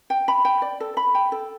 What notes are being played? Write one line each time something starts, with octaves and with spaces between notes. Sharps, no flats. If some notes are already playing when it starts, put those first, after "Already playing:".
G5
B5
G5
D5
A4
B5
G5
A4